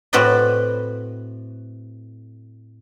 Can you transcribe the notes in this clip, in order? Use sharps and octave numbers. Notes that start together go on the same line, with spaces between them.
A2 C4 F#4 B4 D5 D#5